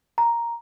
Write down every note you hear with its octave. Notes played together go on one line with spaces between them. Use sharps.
A#5